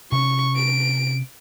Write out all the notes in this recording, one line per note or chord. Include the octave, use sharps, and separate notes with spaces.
C3 C#4 C#6
D7